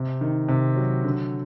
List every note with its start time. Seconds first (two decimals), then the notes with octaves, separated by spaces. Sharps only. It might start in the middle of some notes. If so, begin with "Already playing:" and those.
Already playing: C3
0.21 D#3
0.48 C3
0.76 F#3
1.04 D3